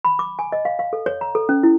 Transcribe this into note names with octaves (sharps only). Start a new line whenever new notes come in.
B5
D6
G#5
D#5
F5
F5
A4
C#5
A#5
A4
C#4
E4